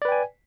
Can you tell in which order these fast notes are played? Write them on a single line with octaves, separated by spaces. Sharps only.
D5 B4 G5 G#5